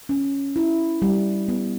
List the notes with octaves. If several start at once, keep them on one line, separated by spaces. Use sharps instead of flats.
C#4
E4
G3
B3